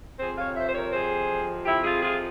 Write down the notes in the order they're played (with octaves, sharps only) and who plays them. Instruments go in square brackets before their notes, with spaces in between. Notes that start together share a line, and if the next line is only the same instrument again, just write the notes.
[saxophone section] F2 C3 F3 C4 G#4 C5
C#5 F5
C5 E5
C5
A#4 C#5
G#4 C5
E4 G4
F4 G#4
F4 G#4